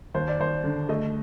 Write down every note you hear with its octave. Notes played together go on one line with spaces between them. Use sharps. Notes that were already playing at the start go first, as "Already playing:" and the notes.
D#2 C5
D5
D#2 C5
D3
A3 D#5